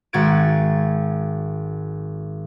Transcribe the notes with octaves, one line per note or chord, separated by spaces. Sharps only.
G#1 F#4 G#6 A6 D7